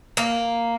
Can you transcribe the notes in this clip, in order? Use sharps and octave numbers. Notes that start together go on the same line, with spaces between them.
A#3